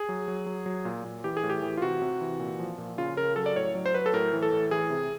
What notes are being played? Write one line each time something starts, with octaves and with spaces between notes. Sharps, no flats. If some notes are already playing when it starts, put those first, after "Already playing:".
Already playing: G#4
F#3
F#3
F#3
F#3
A#2
A#2
E3 G4
G#4
A2
G4
E3
F4
C3 F#4
C3
E3
A#2
F3
A#2
C#3 F4
C#3 A#4
F#3 A4
D5
A2 C#5
F#3
C5
F#3 B4
A4
A2 A#4
E3
A4
A2
E3 G#4
C3